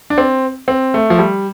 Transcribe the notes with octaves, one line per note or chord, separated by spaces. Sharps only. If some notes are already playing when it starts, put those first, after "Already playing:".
D4
C4
C4
A3
F3
G3